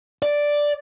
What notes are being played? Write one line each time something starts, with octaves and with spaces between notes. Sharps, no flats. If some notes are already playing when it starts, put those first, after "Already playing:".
D5